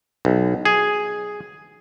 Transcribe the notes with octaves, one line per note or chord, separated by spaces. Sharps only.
B1
G#4